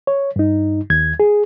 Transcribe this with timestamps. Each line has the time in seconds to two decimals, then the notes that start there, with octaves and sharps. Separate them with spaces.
0.07 C#5
0.36 G2 D#4
0.90 D#2 G#6
1.20 G#4